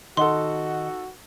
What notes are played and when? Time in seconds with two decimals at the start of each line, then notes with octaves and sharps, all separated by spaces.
0.17 D#3 D#4 F#4 A4 D#5 F#5 C6